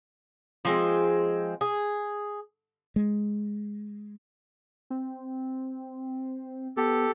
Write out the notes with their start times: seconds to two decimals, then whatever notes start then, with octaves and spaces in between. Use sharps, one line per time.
0.65 F3 G#3 C4
1.61 G#4
2.96 G#3
4.90 C4
6.77 B3 G4 A4